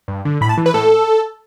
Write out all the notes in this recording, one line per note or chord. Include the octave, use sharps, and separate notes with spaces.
G2
D3
A2 B5
A5
E3
B4
A2 A4